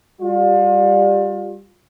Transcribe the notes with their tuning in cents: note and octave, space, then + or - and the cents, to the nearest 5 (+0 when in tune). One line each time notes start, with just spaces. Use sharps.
G3 +10 F4 +35